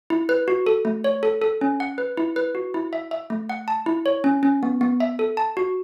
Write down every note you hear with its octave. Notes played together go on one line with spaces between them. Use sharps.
E4
B4
F#4
A4
A3
C#5
A4
A4
C#4
F#5
B4
E4
B4
F#4
E4
E5
E5
A3
F#5
A5
E4
C#5
C#4
C#4
B3
B3
E5
A4
A5
F#4